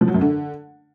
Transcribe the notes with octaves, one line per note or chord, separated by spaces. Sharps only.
F3
F#3
F#2
D3